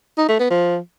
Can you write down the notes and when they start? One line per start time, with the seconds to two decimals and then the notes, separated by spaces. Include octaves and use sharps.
0.18 D#4
0.29 A3
0.40 B3
0.50 F3